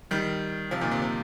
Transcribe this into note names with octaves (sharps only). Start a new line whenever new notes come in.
D#3 G3
C3 F3
A#2 D#3
C3
C3